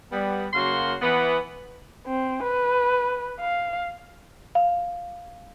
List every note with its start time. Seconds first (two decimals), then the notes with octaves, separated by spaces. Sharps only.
0.12 G3 B3
0.54 F#2 C#3 A#3 F#4 F5 C6
1.02 E3 B3
2.07 C4
2.43 B4
3.40 F5
4.55 F5